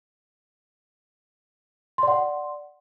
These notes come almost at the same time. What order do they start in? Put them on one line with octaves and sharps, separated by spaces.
C6 D5 F#5